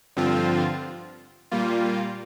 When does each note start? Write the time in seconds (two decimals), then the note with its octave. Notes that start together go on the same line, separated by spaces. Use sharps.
0.16 G2 D3 F3 C4 F4
1.51 A#2 G3 A#3 F4